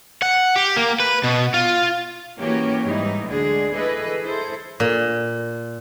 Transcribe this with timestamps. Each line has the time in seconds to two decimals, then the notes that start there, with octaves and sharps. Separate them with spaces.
0.22 F#5
0.56 G4
0.77 A#3
1.00 B4
1.24 B2
1.54 F4
2.39 E3 A#3 C#4 F#4 G4 C#5
2.86 G#2 E3 G3 D#4
3.27 D2 D3 G#3 D4 G#4
3.73 E3 G#4 A4 B4 D#5
4.23 E4 G#4 A4 C5
4.80 A#2